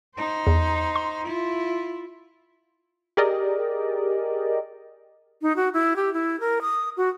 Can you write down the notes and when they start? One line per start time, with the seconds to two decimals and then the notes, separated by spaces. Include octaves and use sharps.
0.16 D#4 C5
0.47 E2
0.96 C6
1.27 E4 F4
3.17 G4 G#4 A#4 D5 D#5
5.42 D#4
5.56 F#4
5.74 E4
5.96 G4
6.14 E4
6.40 A#4
6.62 D#6
6.97 F#4